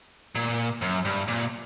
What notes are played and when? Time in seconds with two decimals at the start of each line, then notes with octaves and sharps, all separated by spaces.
0.35 A#2
0.82 F#2
1.05 G2
1.28 A#2